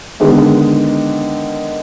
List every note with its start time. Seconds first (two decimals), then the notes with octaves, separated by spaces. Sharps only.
0.20 D3 D#3 G#3 B3 D#4